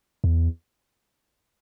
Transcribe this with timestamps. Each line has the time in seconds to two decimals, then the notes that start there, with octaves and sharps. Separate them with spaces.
0.24 E2